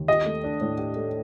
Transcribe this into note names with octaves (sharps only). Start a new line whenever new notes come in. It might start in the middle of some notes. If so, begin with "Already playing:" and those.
Already playing: D#2
G4 D#5
A3
D4
A2
G4
A3